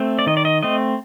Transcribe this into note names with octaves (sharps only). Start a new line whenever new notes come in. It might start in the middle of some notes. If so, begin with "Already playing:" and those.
Already playing: A3 C4
D5
D#3 D#5
D5
D#5
A3 C4 D#5